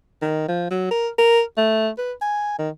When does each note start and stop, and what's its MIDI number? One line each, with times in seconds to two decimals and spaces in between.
0.22 0.48 51
0.49 0.70 53
0.71 0.91 54
0.91 1.09 70
1.18 1.42 70
1.58 1.90 57
1.98 2.13 71
2.22 2.58 80
2.59 2.69 51